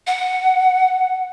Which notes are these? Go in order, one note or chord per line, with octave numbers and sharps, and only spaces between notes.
F#5